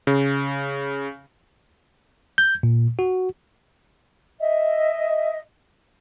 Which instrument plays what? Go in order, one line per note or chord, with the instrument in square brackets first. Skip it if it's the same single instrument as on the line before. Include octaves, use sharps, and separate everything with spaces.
[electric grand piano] C#3
[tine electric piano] G6
A#2
F#4
[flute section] D#5 E5